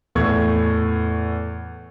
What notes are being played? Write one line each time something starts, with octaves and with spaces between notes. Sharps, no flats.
E2 A2 E3 A3 C#6 G#6